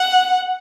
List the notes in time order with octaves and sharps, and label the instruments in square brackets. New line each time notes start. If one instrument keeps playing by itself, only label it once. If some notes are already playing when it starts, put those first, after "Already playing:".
Already playing: [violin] F#5